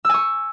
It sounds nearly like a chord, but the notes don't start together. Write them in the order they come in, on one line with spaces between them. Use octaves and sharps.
E6 G#5 C#6